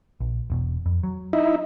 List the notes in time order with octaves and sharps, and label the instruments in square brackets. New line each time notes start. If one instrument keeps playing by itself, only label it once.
[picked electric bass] A#1
E1 B2
F2
F#3
[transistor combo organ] D#4 E4